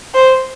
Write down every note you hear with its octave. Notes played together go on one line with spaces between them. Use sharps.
C5